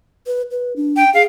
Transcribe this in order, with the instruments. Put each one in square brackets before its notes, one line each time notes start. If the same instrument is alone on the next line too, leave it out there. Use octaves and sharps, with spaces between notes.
[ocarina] B4
B4
D4
[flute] G5
[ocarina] G#4 [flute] F5